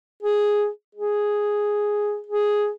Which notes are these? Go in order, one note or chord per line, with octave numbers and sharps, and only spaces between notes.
G#4
G#4
G#4